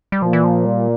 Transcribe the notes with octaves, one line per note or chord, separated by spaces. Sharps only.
G3
A#2 F3
E3
F3
G3